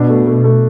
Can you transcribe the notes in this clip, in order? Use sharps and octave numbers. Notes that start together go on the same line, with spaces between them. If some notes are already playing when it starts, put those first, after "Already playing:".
Already playing: B2 D4
A3
A3
A3